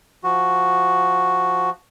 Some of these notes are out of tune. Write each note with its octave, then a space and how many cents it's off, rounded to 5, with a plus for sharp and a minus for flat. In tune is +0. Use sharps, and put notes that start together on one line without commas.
F3 +0 F#4 +0